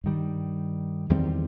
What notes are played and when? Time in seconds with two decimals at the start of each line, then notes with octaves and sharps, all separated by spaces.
0.04 G2 D#3 G3
1.10 E2 D#3 G3 C4